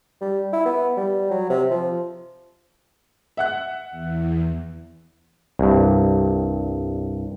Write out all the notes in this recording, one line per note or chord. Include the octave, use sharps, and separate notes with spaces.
G3
E4
B3
G3
F#3
C3
F3
E5 F#5 F#6
E2
C2 G2